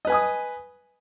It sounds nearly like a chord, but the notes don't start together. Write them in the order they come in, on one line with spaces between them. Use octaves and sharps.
D#5 B4 G#5 D#6